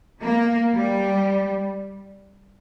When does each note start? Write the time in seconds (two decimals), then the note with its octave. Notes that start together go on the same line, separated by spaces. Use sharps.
0.22 A#3
0.75 G3